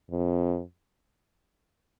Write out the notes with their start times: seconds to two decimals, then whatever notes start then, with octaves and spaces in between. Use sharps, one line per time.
0.11 F2